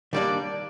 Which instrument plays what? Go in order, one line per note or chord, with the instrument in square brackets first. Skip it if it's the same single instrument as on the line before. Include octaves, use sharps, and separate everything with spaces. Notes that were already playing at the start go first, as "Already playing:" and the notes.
[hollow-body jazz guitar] D#3 G3 A#3 D4 [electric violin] D5